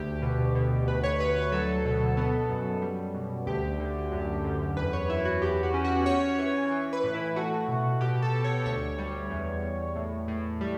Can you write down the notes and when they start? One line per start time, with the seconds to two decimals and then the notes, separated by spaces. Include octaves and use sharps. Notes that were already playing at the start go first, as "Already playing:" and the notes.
Already playing: D2 G4
0.22 B2
0.55 B2
0.88 D2 B4
1.03 C#5
1.20 D2 B4
1.36 B4
1.52 F#3 A4
1.85 B2
2.17 B3
2.49 F#2
2.82 G3
3.14 B2
3.47 D2 G4
3.79 D3
4.12 F#2
4.44 F#2
4.76 E2 B4
4.93 C#5
5.09 E2 E4
5.25 F#4
5.42 E2 G4
5.63 F#4
5.74 C#4
5.84 F#4
6.06 C#4 C#5
6.38 E3
6.71 E3
6.93 B4
7.04 A2
7.14 E4
7.36 A3 F#4
7.68 B2
8.01 B2 G4
8.22 A4
8.33 B2
8.44 C#5
8.65 D2 C#5
8.98 G3
9.30 E2
9.63 E2
9.96 A2
10.28 A2
10.61 G3